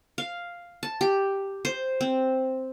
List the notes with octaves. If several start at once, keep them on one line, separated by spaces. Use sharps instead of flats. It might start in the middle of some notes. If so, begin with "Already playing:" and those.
F5
A5
G4
C5
C4